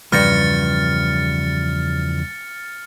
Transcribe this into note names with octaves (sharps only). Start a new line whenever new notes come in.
E2 G2 C#3 F3 A#5 F6 A6 C#7